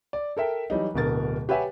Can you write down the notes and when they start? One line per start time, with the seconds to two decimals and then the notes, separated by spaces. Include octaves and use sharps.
0.13 D5
0.37 A4 A#4 E5 G5
0.70 E3 F#3 G3 D#4
0.94 D1 B2 D3 A#4 A6
1.49 G4 B4 C#5 E5 F#5 G#5